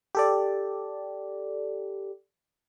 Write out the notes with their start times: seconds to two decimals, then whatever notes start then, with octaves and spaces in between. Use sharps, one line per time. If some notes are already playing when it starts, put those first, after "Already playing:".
0.15 G4 A4 D5